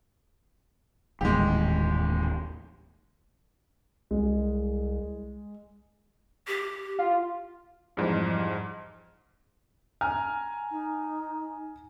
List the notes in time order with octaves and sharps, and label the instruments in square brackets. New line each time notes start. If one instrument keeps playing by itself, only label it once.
[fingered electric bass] D#1 A1 D#2 [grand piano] G#3 G4
[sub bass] C2 [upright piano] G#3
[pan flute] G4
[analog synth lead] F4
[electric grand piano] F2 G#2 [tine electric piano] E3 F3 G3
[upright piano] G#5 A#5 F6
[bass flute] D#4